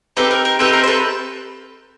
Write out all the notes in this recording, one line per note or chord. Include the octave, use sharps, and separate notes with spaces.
C4 D#4 G4 A4 B4
A#4
A#4
C4 D#4 G4 A4 B4
A#4
C5
A4 B4